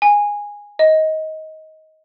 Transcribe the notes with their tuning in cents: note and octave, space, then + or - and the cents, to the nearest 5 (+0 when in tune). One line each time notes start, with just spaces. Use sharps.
G#5 -10
D#5 +20